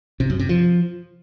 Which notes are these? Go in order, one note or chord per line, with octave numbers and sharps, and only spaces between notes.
C3
F#2
C3
F3